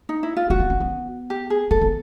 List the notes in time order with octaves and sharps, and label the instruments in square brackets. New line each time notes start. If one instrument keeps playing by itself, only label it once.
[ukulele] D#4
E4
F4
[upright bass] B3 [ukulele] F#4
[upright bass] A#3
C#4
B3
[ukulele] G4
G#4
[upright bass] A#3 [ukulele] A4
[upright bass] B3